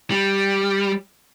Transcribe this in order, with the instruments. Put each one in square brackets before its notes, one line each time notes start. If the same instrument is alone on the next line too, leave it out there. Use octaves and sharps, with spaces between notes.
[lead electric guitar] G3